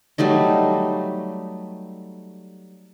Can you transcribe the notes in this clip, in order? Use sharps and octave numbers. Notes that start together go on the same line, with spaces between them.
F#3 G3 A3 D#4